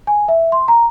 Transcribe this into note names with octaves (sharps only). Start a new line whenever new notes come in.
G#5
E5
C6
A#5